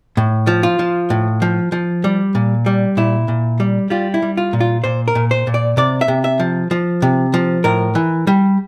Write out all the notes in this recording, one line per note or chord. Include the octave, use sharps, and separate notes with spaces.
A2
F3
F4
F3
A2
F3
F3
G3
A#2
G3
A#2 E4
A#2
G3
G3 F4
E4
G3
F4
A#2
F4
A#2 C5
A#4
A#2
C5
A#2
D5
C3 D5
E5
C3
E5
F3
F3
C3
F3
A2 A#4
E3
G3